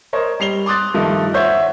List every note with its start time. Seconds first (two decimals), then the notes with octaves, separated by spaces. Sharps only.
0.13 A#4 C5 C#5 D#5
0.40 G3 C7 F7 G7
0.66 C6 D6 D#6 F#6 A6
0.94 G2 D#3 F3 A3 D#4
1.34 C5 C#5 E5 F#5 G6